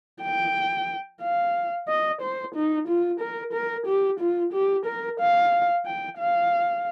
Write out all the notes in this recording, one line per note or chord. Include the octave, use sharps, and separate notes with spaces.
G5
F5
D#5
C5
D#4
F4
A#4
A#4
G4
F4
G4
A#4
F5
G5
F5